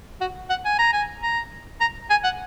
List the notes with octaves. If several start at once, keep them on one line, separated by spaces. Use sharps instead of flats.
F#4
F#5
G#5
A#5
G#5
A#5
A#5
G#5
F#5